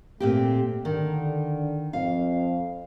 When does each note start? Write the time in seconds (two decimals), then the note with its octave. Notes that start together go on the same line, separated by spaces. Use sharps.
0.20 A#2 A3 C4 G4
0.85 D3 D#3
1.93 F2 F5